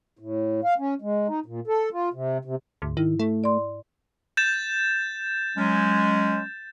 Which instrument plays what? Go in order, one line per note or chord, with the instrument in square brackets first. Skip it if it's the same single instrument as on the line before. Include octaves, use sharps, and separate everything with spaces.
[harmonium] A2
F5
C#4
G#3
D#4
A#2
A4
F4
C3
C3
[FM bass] D2 [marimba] G#2
[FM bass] D#3 [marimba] E4
[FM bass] A3
[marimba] D5 C6
[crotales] G6 A6 E7
[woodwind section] F#3 G#3 C#4